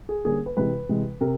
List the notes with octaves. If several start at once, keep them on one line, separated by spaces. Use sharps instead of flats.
G#4
D3 G3 A#3 C#4 G#4
B4
C3 E3 G#3 B4
C3 E3 G#3
C3 A#4